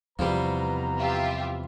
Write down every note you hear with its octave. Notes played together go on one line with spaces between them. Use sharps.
E2 C3 F3 G3 B3 B4 A#5
F4 G4 E5